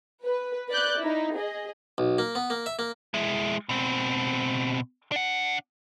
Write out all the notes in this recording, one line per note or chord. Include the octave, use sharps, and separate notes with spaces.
B4
B4 D5 F#6 G6
D#4 E4
G#4 D#5
B1
A#3
B3
A#3
E5
A#3
G#3 E4
B2 C4
D4 F#5